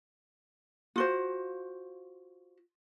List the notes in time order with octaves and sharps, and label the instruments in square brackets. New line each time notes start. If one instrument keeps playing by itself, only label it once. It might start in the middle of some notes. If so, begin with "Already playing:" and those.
[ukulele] F4 F#4 C5